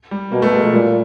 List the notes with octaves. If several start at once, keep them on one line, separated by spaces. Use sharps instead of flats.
G3
B2 A#3
A3
G#3
F3
A#2 G3